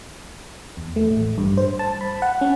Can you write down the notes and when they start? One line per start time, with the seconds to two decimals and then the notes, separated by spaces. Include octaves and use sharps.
0.77 E2
0.96 A3
1.10 A1
1.38 G2
1.57 C5
1.79 A5
2.01 B5
2.22 F#5
2.41 C#4